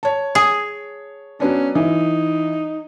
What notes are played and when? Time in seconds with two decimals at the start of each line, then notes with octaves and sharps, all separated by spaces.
0.03 C#5 A5
0.35 G#4
1.40 F#3 B3 C#4 D4
1.75 E3 D#4